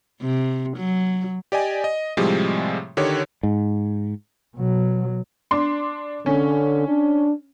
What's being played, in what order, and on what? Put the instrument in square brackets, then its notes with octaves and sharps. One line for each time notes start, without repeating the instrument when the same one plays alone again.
[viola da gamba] C3
F#3
[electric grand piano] G4 D5 D#5 G#5
D#5
A2 C3 F3 G3 G#3
D3 D#3 G4 C#5
[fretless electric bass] G#2
[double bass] B2 F#3
[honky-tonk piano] D4 C6
[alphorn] D3 [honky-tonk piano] C#4
[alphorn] D4